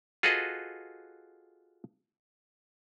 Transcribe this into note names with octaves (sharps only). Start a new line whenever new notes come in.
F4 F#4 G#4 A4 B4 D#5